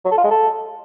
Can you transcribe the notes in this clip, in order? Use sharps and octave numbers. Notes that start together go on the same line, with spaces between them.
F#3
A4
F4
G#3
A4